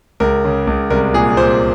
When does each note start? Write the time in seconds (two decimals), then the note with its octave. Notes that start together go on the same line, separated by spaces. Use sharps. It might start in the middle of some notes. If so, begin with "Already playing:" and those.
0.20 C#2 A#4
0.45 C#3
0.67 C#2
0.90 C2 A#4
1.14 A#2 G#4
1.37 A#2 C5